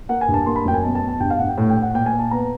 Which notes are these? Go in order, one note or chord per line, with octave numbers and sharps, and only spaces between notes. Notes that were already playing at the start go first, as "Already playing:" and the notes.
A#3 F#5
G#5
G2
A5
A#3 C6
B5
F#2 G5
G#5
B2 A5
A5
B2
A5
G2 G5
F5
G2 F#5
G5
A2
G5
A2
F#5
A#2 G5
G#5
A#2
A5
B3 A#5